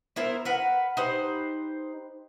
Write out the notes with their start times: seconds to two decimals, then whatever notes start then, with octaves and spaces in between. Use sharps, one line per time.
0.16 B3 E4 A#4 C5
0.45 A#4 B4 F#5
0.97 D#4 G4 B4 C5